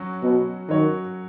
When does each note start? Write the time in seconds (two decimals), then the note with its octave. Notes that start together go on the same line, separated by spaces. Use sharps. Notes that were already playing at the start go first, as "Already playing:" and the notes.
Already playing: F#3 C#4 F#4
0.22 B2
0.68 D#3 F#3 C#4 F#4 C#5